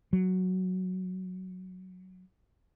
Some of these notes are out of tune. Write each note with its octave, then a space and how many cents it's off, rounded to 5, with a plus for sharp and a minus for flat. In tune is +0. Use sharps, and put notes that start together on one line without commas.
F#3 +0